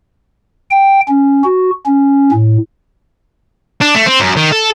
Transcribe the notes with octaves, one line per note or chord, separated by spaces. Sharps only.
G5
C#4
F#4
C#4
A2
D4
A3
C4
F#2
D#3
A4